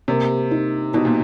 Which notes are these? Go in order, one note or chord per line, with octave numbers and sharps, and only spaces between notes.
C3 A#3
D#4
B2 D#4
A#2